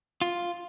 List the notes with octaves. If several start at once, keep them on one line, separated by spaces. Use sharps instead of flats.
F4